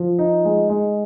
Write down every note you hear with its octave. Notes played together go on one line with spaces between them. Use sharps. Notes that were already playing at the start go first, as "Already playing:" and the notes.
Already playing: F3
D#4
G#3
G#3